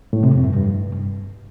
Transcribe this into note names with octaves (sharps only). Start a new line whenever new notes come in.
A2
C3
F2
G2
G2